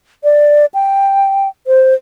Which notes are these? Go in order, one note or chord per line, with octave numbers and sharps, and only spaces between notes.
D5
G5
C5